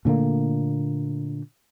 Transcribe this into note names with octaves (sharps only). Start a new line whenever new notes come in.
A#2 D3 A3 A#3